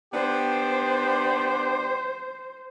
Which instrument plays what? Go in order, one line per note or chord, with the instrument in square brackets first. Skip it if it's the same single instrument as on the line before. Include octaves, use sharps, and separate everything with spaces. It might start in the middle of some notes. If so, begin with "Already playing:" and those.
[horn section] B3 D4 G4 [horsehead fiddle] C5